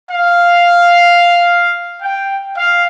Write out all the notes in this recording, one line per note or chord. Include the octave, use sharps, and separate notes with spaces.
F5
G5
F5